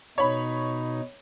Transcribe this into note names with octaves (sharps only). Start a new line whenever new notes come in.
B2 D#4 C#5 B5